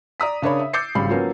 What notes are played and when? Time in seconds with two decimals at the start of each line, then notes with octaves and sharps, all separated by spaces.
0.20 D5 A#5 D#6 B6
0.42 C#3 D4 A#4 C#5 B5
0.59 E5
0.73 D6 E6 G6 A6 C7 C#7
0.95 G#1 C#3 G3 B5 C7
1.10 F3 F#3 A#3 B3 C#4